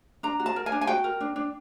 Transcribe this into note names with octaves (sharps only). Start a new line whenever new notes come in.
D4 A#5
F#4
A5
A#4
G#5
D4
G#5
F#4 G5
A#4
D4
D4